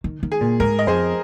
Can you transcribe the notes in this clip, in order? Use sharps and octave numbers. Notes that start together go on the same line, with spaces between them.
D#3
D#3
G#4
A#2
G#2 A#4
D#5
F2 G#4 C5